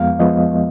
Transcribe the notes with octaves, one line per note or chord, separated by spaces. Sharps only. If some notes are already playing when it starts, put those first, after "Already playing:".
Already playing: F2 F3 G#3 B3 F5
F3 G#3 B3 D#5